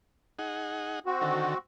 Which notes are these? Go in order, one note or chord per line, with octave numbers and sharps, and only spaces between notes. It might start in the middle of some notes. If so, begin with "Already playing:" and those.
D#4 G#4 F#5
C4 F#4
D3 D#3 A4